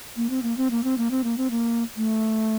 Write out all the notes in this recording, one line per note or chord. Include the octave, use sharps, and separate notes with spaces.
A#3
C4
A#3
C4
A#3
C4
A#3
C4
A#3
C4
A#3
A3